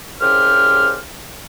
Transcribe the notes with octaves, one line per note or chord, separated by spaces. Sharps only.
C2 C#3 G4 C5 F6